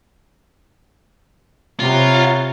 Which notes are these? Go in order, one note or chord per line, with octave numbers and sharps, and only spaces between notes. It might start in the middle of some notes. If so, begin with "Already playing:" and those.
C3 B3 F4 C#5 A#5